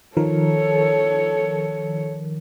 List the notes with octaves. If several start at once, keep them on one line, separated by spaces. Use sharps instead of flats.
D#3 F3 A4 A#4 C#5